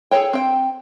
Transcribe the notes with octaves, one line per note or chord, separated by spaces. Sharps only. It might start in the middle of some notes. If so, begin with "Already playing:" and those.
G#4 A4 C5 C#5 G5
C4 G5